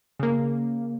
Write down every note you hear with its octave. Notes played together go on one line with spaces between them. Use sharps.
C#3 A#3